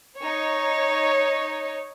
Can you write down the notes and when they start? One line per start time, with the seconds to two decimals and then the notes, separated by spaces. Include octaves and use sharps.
0.18 D#4 C#5